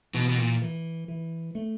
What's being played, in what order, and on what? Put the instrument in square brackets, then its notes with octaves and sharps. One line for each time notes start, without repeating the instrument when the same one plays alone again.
[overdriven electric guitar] B2 [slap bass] E3
[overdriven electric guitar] B2
A#2
[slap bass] E3
E3
A3